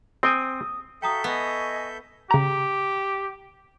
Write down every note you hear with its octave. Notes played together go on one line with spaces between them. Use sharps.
C4 G5 G#5 D#6
F#4 A4 E5 F5 G5 A#5 D#6 G6
B3 D#5 G#5 C#6 B6
C#3 G4 A#5